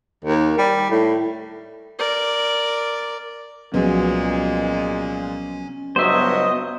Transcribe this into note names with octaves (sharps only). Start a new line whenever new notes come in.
D#2
G3
A2
A#4 D5
C2 A#2 F3 F#3 G#3 B3 C#4
C#2 G2 F#3 B3 C5 D#5 E5